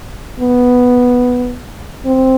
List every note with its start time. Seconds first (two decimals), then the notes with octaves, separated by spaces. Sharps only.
0.40 B3
2.06 C4